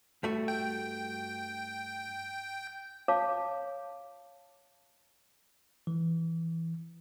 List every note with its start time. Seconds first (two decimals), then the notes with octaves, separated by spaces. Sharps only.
0.23 G2 A3 F#4
0.48 G5
3.08 C#5 F5 A5 D6
5.87 E3